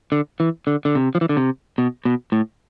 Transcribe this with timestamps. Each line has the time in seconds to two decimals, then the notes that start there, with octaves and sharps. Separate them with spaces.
0.12 D3
0.40 E3
0.67 D3
0.85 D3
0.95 C3
1.15 F3
1.21 E3
1.29 D3
1.37 C3
1.78 B2
2.05 B2
2.32 A2